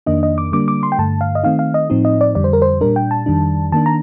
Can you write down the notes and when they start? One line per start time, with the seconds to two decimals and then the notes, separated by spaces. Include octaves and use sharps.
0.06 F2 D#3 A#3 D4 D#5
0.23 D#5
0.38 D6
0.52 D3 G3 A#3 D4 D6
0.68 D6
0.83 C6
0.92 G5
0.98 G2 D3 A3 A5
1.21 F5
1.35 D#5
1.43 D#3 A3 C4 D#4 F5
1.59 F5
1.74 D#5
1.90 A2 F3 C4 D#4
2.05 D#5
2.21 D5
2.35 F2 D3 G3 D5
2.44 C5
2.53 A#4
2.62 C5
2.81 A#2 G3 D4 A#4
2.96 G5
3.11 A5
3.26 F2 D#3 G3 D4
3.72 D#3 A#3 D4 A5
3.86 A#5